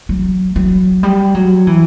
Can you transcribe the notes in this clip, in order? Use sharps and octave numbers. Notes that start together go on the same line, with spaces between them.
F#3
F#3
G3
F#3
E3